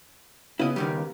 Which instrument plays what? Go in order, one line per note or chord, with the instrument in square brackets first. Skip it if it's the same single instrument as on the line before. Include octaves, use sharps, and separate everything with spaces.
[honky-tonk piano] C#3 B3 [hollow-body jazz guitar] E4 D#5
[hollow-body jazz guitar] D#2 D#3 G3